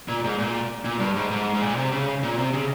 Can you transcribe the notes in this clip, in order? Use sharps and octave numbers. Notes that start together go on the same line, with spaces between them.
A#2
G#2
A#2
A#2
G2
G#2
G#2
G#2
A#2
C3
C#3
A#2
C3
C#3